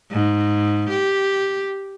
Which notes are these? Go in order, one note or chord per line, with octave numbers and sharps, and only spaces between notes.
G#2
G4